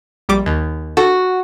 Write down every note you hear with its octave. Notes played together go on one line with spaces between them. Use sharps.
A#1 G3 D6
D#2
F#4 A4